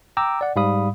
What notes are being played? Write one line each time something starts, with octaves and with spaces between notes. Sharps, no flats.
G5 A#5 D6 E6
D5 F#5
G#2 G3 F5 B5 D#6